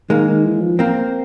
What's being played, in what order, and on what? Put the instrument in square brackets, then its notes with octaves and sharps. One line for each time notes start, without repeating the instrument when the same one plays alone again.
[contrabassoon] D#3 [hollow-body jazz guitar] G#3 A#3
[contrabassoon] D#3
E3
F3
[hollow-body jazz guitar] A#3 C4